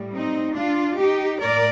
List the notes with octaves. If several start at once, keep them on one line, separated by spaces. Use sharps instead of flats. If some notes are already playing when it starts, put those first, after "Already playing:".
Already playing: A2 G3
C4 D#4
D4 F4
D#4 G4
A2 A#4 D5